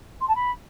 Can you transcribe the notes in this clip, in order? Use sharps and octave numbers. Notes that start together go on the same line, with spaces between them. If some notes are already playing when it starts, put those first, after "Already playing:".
C6
A5
B5